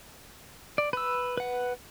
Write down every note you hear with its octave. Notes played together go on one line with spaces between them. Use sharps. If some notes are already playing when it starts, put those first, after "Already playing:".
D5
B4 E6
B4 F#5